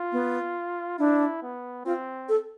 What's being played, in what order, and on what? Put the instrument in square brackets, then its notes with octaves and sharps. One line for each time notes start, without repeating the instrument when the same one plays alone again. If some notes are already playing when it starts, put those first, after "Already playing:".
Already playing: [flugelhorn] F4
[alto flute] B3
[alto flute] D4 [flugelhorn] E4
[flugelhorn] B3
[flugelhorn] C4 [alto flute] F4
[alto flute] A4